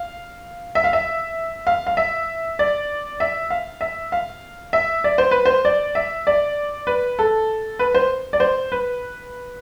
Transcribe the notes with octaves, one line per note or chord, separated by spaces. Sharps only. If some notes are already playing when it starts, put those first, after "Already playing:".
Already playing: F5
E5
F5
E5
F5
F5
E5
D5
E5
F5
E5
F5
E5
D5
C5
B4
C5
D5
E5
D5
B4
A4
B4
C5
D5
C5
B4